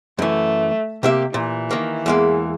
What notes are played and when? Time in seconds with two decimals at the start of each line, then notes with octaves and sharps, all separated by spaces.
0.19 F#2 E3 A3
1.03 C3 A#3 G4 E5
1.34 A#2 E3
1.71 D#3 A#3
2.06 E2 G#3 A#3